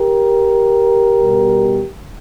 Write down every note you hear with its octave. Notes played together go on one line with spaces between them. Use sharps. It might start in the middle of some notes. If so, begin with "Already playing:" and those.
Already playing: G4 A#4
B2 G3 B3